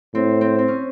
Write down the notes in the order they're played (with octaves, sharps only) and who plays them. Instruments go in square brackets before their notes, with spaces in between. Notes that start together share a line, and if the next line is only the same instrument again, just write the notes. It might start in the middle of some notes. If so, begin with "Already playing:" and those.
[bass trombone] A2 [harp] C4
[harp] C4
C4
C#4